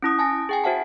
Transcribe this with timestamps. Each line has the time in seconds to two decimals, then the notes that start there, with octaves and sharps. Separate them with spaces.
0.02 C#4 E4 D#6
0.19 G#5 A5 A#6
0.49 G#4 G5 G#5
0.64 F#4 C5 E5 F#5 A5